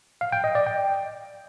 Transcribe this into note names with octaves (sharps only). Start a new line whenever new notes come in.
F5
G5
D#5
D5
G5